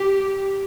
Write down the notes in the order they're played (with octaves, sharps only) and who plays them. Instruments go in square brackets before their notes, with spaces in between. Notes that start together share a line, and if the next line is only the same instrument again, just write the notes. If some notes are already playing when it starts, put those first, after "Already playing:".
Already playing: [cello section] G4